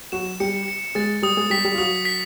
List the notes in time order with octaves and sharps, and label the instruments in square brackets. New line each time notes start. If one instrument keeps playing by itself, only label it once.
[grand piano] F#3 F#4 [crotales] E7
[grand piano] G3 G4 [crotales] C#7
[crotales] C#7
[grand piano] G#3 G#4 [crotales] A6
[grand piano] G3 G4 [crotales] D#6
[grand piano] G#3 G#4
[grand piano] G3 G4 [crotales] B6
[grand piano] G3 G4
F4
[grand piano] F#3 F#4 [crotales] D#6
[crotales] B6